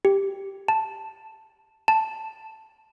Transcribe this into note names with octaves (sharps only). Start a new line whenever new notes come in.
G4
A5
A5